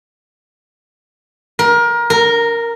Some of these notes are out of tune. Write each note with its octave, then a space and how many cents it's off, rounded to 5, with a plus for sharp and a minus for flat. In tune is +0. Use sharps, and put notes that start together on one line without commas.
A#4 +25
A#4 -5